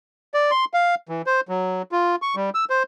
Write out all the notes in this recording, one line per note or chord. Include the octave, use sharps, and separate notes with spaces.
D5
C6
F5
E3
C5
F#3
F4
C#6
G3
E6
C5